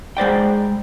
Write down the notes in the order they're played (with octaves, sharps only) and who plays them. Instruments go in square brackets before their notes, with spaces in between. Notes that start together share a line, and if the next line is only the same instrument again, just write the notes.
[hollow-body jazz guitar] G#3 C5 D5 G5